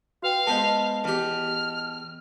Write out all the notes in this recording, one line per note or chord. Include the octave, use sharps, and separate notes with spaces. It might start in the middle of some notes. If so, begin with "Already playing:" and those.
F#4 B4 F5 G5
G#3 B3 C5 D#5 A5
E2 G4 F6